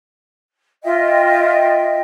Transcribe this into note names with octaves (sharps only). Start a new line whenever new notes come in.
F4 D#5 E5 G5